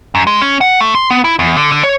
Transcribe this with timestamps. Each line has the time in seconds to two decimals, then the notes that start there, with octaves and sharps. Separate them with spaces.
0.15 F#2
0.27 G#3
0.42 C#4
0.61 F#5
0.81 A3
0.95 C6
1.11 B3
1.24 E4
1.39 E2
1.57 D3
1.72 D3
1.83 C#5